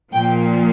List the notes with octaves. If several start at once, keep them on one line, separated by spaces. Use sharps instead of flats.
A#2 F3 G5